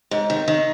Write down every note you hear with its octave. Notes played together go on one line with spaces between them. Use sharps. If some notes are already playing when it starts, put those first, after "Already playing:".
G#2
D#3
D#3